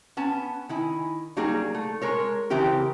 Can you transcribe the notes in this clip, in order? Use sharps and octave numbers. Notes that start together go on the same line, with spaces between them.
B3 C#4 A5
D#3 E4 G#5
F#3 G3 A#3 D#4 G#4
A3
G#3 A#4 C#5
C#3 E3 C4 G4 A#4